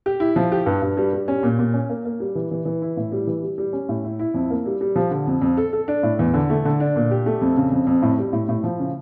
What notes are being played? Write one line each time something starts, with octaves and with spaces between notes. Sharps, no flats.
G4
E4
F3
G4
G2
G2
G3
G3
C#4
A#2
A#2
C#4
A#3
A#3
G3
E3
E3
E3
E4
A2
G3
E3
G3
G3
C#4
A2
E4
E4
F2
A#3
G3
G3
F3
D3
F2
F2
A4
A4
D4
A2
E2
D3
A3
D3
D4
A#2
G4
A3
F2
C#3
F2
F2
A2
G3
A2
A2
F3
C#3